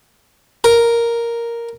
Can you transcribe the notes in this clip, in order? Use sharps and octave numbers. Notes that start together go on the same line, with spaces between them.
A#4